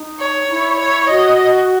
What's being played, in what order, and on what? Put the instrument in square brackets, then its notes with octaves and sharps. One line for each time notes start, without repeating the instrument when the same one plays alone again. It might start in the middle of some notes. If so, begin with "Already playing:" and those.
Already playing: [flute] D#4
[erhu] C#5
[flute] E4
[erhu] C#5
[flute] F#4 [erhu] D#5